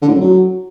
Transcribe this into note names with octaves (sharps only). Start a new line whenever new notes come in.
D3
A2
F#2
F#3